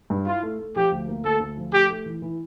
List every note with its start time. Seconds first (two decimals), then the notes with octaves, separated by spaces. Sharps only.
0.10 G2
0.26 E4 F4
0.43 A3
0.59 A3
0.75 F3 G4
0.92 D2
1.08 A#3
1.24 D2 A4
1.40 D2
1.57 F3
1.73 A3 G4
1.90 A3
2.06 E3
2.22 E3